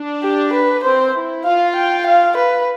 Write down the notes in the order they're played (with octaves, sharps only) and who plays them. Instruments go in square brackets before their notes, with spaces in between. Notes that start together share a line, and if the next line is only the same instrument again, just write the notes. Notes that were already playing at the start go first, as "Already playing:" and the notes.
Already playing: [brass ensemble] D4
[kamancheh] G4
B4
[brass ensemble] C4 [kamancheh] C5
[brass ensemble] E4
[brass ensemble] F4 [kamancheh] F5
[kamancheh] G5
F5
B4